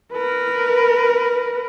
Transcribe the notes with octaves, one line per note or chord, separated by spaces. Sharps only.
A#4 B4